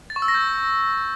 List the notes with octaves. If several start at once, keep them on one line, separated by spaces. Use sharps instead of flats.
A6
C#6
E6
A#6
G6